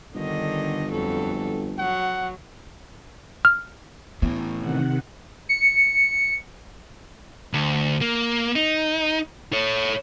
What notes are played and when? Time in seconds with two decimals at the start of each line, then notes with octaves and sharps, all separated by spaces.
0.14 G1 D3 D#3 D#5
0.91 F2 F#3 A4
1.78 F#3 F#5
3.45 F6
4.22 A2 E3 B3
4.59 C3 D#3 F#5
5.49 C#7
7.54 D2
8.01 A#3
8.56 D#4
9.53 A4 C#5